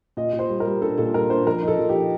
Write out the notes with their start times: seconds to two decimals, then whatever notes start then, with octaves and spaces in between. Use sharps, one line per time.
0.17 A#2 D#5
0.33 A#2
0.39 C5
0.49 G3
0.60 A#4
0.66 G3
0.81 D4 A4
0.98 A#2 A4
1.14 G3 A#4
1.30 D4 C5
1.46 F3 A#4
1.63 D#4
1.68 A4
1.79 F3
1.89 G4
1.95 D#4